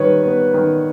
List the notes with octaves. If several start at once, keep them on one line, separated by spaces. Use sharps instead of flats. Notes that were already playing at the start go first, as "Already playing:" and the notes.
Already playing: D#3 G3 B4 C#5
B3
D#3